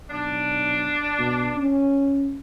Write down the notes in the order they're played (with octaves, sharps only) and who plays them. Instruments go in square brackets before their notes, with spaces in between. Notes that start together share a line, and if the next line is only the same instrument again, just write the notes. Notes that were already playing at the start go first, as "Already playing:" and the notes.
[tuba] B1 [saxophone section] D4
[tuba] B2
C#4